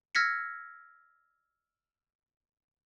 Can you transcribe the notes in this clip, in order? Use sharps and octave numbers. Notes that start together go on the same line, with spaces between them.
E6 F6 G#6 A#6 B6 C#7